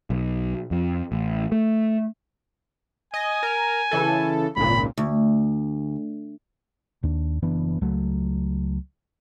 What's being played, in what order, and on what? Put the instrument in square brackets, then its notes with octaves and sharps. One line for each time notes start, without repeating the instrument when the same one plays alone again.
[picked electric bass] B1
F2
A1
A3
[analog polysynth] D#5 [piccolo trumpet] G#5
[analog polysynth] A#4
C#3 E3 A4
[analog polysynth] G#1 C#2 A#2 [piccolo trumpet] B5
[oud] D2
[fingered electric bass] D#2 D4
F#1 E3 B3 D4
C#2 F#3 A3